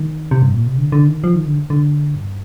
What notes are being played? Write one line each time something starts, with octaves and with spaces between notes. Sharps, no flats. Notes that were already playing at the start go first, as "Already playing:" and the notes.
Already playing: D#3
C3
G2
A#2
C3
D3
D3
D#3
F3
D#3
D3
D3
G2